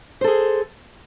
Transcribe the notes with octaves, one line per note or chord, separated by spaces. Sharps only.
G#4 A4 C5